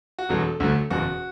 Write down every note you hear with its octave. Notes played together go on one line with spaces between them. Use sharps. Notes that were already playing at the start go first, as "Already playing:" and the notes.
F#4
E1 E2 B2 F#3 A4
D2 D3 F#3 A3
F#1 E2 B2 F#4